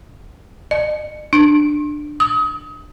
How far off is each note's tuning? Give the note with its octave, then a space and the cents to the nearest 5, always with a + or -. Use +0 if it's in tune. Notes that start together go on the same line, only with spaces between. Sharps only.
D#5 -40
D4 +15
D#6 +35